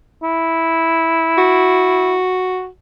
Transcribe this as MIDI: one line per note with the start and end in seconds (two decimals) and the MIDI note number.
0.23 2.18 64
1.38 2.68 66